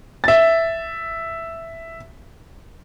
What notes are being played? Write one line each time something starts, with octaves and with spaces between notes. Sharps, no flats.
E5 A6